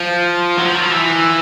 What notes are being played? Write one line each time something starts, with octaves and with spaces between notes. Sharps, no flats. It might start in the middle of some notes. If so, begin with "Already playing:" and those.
Already playing: F3
F#3
F3
F#3
F3
E3